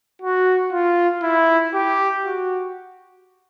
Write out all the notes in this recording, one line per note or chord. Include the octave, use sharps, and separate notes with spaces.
F#4
F4
E4
G4
F#4